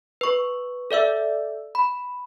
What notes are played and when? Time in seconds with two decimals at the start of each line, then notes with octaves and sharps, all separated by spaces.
0.21 B4 C#6
0.91 A4 D5 E5 E6
1.75 B5